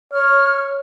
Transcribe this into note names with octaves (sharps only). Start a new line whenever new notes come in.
C#5 F6